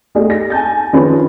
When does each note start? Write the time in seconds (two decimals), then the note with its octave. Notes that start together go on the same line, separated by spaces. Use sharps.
0.15 A3 B3 D#4 G4 G#4 D5
0.30 A#6
0.50 G#5 A5 G6 A6
0.93 D#3 F3 C#4 D4 G#4 B4